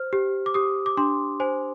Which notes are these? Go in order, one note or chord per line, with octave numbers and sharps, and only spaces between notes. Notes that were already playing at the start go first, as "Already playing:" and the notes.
Already playing: C5 F6
G4
D6
G4 D#6
D6
D4 C6
C5 G#5